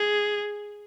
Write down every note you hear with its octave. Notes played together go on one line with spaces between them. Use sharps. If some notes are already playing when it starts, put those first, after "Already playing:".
Already playing: G#4